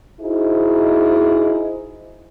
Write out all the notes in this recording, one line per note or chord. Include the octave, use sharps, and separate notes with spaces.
D#4 E4 F#4 G#4 C5 D#5